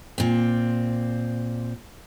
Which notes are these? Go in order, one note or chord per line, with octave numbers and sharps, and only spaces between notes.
A#2 C4